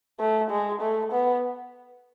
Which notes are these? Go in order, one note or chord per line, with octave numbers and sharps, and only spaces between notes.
A3
G#3
A3
B3